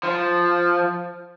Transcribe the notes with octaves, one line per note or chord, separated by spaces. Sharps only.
F3